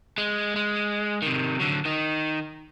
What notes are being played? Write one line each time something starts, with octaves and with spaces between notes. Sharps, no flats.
G#3
G#3
C3 D#3
D3 F#3
D#3 D#4